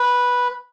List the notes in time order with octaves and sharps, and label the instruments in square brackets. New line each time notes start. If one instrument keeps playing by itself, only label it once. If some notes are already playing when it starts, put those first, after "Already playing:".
Already playing: [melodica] B4